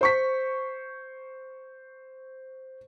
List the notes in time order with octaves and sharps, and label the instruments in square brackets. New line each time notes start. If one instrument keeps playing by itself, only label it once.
[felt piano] C5 C#6 B6